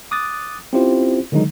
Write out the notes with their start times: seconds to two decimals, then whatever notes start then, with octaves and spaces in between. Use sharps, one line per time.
0.11 D6 D#6 F#6 A6
0.73 C4 C#4 E4 F4 G4 C5
1.32 D3 D#3 F#3 G#3 D#4